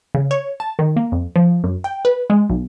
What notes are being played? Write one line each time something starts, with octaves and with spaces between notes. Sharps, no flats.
C#3
C#5
A5
D#3
A#3
F2
F3
F#2
G5
B4
G#3
B1